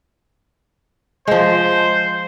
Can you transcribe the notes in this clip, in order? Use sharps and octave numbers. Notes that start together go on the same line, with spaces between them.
F3 G#3 C5